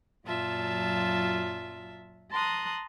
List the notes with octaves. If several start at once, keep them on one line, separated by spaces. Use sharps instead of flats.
F#2 A#2 F#3 F4 E5 A5
A5 A#5 C6 D#6 F#6